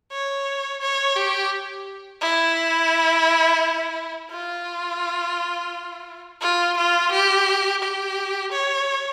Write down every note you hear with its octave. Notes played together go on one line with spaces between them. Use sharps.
C#5
C#5
G4
E4
F4
F4
F4
G4
G4
C#5